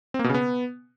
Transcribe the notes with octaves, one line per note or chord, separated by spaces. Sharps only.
C4
A#3
B2
C#3
B3